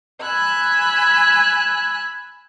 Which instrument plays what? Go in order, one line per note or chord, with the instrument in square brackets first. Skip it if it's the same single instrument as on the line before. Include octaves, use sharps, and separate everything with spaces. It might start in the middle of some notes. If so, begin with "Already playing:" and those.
[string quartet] G#5 B5 E6 F#6